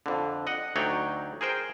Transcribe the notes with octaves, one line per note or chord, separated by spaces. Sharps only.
F2 D3
D#5 F#5
D2 F#3 D#4 C#5 D5 G5
G#4 A#4 C5 G5